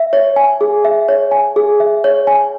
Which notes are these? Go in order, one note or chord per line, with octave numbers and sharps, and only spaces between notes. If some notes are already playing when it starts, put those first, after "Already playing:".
Already playing: E5
C#5
G#5
G#4
E5
C#5
G#5
G#4
E5
C#5
G#5